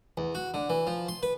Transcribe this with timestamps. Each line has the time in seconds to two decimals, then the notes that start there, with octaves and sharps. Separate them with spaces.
0.17 E2
0.35 F#4
0.54 D3
0.69 E3
0.87 F3
1.08 C6
1.23 B4